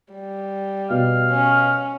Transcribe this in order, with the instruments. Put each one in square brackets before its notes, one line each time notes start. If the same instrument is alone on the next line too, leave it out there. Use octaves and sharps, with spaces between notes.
[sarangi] G3
[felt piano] B2 [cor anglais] F5
[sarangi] C#4